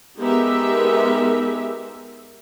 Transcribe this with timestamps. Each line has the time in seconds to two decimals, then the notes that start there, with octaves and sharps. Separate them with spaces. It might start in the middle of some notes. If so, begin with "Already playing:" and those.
0.19 G#3 B3 D#4 G4 A#4 E5